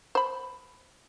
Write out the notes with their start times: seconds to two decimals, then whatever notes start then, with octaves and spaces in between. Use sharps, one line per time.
0.15 C5 B5